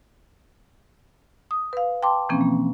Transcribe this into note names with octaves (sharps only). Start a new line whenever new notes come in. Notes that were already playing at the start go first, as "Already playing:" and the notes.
D#6
B4 F5
G5 A5 C6 D6
B2 E3 F3 A#3 C4 C#4
A#3